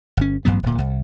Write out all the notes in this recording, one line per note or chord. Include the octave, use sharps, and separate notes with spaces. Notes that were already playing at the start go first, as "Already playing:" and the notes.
G1 C#4
A1 G2 F#3 B3
D1 A#2
C2